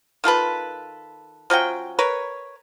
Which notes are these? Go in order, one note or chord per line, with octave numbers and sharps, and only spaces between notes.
D#3 F4 A4 B4
F3 F#3 C#4 G5
A#4 B4 C#5